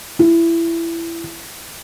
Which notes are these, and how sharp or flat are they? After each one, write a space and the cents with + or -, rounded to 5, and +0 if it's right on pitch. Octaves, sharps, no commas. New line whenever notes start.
E4 +20